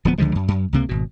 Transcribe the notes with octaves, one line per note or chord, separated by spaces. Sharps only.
D1 F3 F#3 B3
C#2 D3 F3 G#3
F#2
F#2
C#2 C3 A#3
G#1 B2